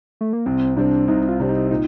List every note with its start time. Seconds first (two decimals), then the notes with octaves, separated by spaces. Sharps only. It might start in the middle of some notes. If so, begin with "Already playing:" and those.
0.21 A3
0.33 A#3
0.46 C2 C4
0.77 C3 G3 C4 D4
1.08 C2 D#4
1.29 F4
1.40 C3 G3 C4 D4
1.49 D#4
1.70 A#2 D#4